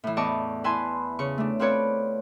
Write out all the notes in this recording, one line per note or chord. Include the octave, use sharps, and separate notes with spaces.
A2 E3
E2 D5 D#5 A5 C#6 D6
E4 B4 G#5 A5 C6
C#3 C#6
A3 D4
C4 F4 A4 B4 C#5 D5